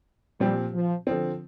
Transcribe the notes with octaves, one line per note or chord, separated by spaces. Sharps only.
A#2 F3 G3 C4 G4
F3
D3 F3 C4